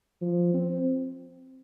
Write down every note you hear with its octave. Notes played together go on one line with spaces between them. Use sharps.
F3
C4